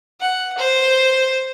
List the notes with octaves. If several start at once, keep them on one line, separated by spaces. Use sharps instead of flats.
F#5
C5